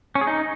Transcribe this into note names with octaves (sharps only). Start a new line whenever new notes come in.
C#4
G#4
D#4